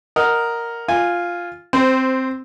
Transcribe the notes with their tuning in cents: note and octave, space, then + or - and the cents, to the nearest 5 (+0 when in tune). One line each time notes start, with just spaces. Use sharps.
A#4 +0 D#5 +0 F#5 +0
F4 +0 G#5 -10
C4 +0 C5 -15